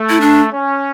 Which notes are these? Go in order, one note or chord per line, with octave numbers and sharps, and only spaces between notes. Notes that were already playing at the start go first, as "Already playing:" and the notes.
Already playing: A3
E4
D4
C#4